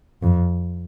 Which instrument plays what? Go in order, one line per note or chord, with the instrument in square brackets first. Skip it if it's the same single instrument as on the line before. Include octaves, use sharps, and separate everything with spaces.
[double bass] F2